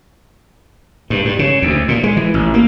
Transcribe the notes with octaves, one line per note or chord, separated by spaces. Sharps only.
G2
G2
C#3
D2
A#2
G#3
E3
A1
A#3